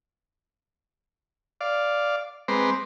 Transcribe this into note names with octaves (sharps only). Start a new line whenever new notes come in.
D5 F5
G#3 C4 B4 A#5 C6 D6